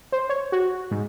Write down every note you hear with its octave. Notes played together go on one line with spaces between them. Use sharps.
C5
C#5
F#4
G#2